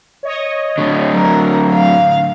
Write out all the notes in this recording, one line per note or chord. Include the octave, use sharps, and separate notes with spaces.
C#5 D#5
A2 D3
F#3 A#4
F5